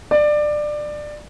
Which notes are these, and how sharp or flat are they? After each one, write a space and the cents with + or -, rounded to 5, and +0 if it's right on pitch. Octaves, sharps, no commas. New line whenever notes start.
D5 +20